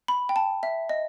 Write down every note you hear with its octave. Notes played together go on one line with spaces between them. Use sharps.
B5
G5
A5
E5
D#5